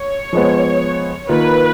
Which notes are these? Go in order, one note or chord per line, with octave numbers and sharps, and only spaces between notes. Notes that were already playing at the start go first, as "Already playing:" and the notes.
Already playing: C#5
F3 G#3 B3
D#3 A#3 F4 B4